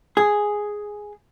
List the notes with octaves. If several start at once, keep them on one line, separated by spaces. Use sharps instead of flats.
G#4